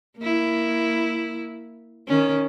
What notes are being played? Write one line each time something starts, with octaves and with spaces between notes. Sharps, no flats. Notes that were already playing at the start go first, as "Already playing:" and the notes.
A#3 E4
D#3 C#4